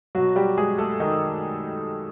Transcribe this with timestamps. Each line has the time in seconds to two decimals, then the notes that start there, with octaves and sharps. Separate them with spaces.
0.15 B2 F#3 F#4
0.36 G3 G4
0.58 G#3 G#4
0.78 A3 A4
1.00 D#3 D#4